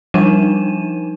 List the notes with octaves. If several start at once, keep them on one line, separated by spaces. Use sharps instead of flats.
F3 G3 D4 D#4 D#7 E7